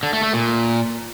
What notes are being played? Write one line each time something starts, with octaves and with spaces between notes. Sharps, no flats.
D3
A3
A3
A#2